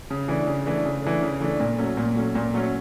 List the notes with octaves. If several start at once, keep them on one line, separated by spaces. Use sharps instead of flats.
C#3
E3 A3 D4
C#3
E3 A3 D4
C#3
E3 A3 D4
C#3
E3 A3 D4
A#2
F#3 A3 C#4
A#2
F#3 A3 C#4
A#2
F#3 A3 C#4